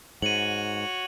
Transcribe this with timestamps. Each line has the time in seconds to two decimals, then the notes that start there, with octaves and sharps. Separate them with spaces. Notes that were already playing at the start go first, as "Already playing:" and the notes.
0.22 G#2 F#4 C#5 D#7 F#7